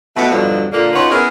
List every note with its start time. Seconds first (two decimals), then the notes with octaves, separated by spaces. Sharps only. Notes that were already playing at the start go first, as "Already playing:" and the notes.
0.16 B2 A3 B3
0.30 E2 G2 B2 D3 F3 F#3
0.72 A#2 D3 A#3
0.93 C#4 D#4 F4 F#4 B4 C#5
1.10 B3 C#4 E4 G#4 A#4